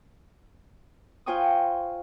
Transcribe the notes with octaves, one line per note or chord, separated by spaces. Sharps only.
F4 C5 G5 G#5 C#6 D#6